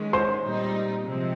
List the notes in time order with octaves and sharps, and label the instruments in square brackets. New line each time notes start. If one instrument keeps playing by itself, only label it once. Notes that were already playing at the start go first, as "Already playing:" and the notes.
Already playing: [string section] D#3 G#3 C#4
[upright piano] C5 C6
[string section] A#2 G3 C4 D#4
C3 F3 G#3 C4